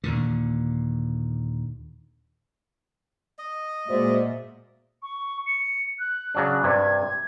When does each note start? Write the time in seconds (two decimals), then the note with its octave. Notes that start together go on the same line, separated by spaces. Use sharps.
0.04 D#2 A#2 D3
3.39 D#5
3.89 A#2 G#3 F#4 C5 D5 E5
5.02 C#6
5.46 C#7
5.99 F#6
6.35 C#3 F#3 D4
6.63 G2 C3 G3 G#6